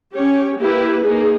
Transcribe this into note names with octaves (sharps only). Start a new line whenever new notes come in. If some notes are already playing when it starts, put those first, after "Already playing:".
C#4 G4 C#5
A#3 E4 G4 B4
A#3 D#4 G#4